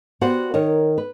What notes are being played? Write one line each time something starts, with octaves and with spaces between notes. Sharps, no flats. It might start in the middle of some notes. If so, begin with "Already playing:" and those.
B3 F#4 G4 C5 D5 F#5
D#3 A#4 C#5 D#5
B4